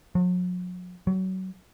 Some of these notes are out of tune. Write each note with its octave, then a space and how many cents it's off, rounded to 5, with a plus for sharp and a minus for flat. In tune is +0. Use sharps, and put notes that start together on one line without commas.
F#3 -45
F#3 +25